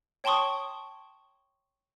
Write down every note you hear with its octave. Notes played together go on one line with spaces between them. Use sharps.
C#5 G5 A5 C6 C#6 D#6